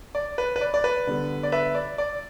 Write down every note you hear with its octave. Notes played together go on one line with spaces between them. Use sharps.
D5
B4
B4
D5
D5
B4
D3 G3 B3
D5
B4 E5
D5
D5